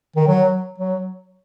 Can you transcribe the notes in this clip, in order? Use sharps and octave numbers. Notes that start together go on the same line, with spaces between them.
D#3
F#3
F#3